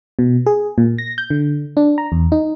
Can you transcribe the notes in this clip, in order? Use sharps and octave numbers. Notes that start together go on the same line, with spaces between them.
B2
G#4
A#2
A#6
G6
D3
D4
A#5
E2
D#4